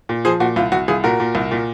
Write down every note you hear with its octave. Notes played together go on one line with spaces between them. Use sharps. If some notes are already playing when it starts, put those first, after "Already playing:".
A#2
F3 G#4 C5
A#2 F#4
C2 F4
C2 F#4
C2 F4 G#4
A#2 F#4 A#4
A#2
C2
A#2